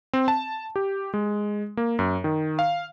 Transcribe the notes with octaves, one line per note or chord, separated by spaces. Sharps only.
C4
A5
G4
G#3
A#3
F#2
D#3
F5